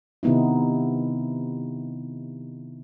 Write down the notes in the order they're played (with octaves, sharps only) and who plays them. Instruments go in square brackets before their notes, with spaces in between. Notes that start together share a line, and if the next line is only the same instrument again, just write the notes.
[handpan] C3 D#3 B3 D#4 E4